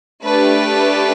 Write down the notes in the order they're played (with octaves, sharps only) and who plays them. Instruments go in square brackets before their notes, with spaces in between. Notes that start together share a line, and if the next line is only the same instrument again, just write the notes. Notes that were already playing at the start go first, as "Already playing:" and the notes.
[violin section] A3 D4 G4 B4